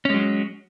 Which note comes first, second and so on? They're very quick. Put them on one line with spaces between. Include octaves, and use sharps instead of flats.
C#4 G#3 F#3